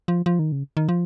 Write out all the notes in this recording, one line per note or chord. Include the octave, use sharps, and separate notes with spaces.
F3
F3
D#3
C#3
D#3
F3